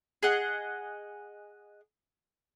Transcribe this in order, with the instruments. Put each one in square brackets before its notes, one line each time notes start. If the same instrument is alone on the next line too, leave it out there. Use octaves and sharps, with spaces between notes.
[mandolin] G#4 D#5 F#5